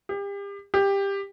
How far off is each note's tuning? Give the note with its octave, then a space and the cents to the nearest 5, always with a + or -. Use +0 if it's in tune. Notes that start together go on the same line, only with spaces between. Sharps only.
G4 +35
G4 +15